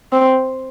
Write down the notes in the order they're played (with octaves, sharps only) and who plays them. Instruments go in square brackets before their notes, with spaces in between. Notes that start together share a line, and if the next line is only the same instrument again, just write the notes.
[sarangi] C4